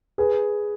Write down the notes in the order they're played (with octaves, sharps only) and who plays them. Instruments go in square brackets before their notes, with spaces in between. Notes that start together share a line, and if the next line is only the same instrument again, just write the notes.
[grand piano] G#4 B4